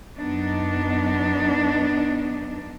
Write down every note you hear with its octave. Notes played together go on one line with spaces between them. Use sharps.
F#2 B3 D4 D#4